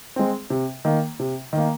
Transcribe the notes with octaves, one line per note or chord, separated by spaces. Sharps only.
G#3 C4
C3
D#3 A#3
C3
D#3 A#3